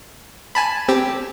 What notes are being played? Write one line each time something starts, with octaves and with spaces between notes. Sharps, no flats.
G#5 A5 B5
C4 G4